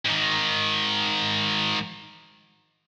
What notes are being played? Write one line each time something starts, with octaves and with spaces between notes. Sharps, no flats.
G#2 D#3